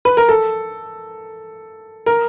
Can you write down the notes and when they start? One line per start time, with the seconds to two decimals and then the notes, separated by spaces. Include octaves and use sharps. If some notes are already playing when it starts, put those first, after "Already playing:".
0.05 B4
0.17 A#4
0.29 A4
2.06 A#4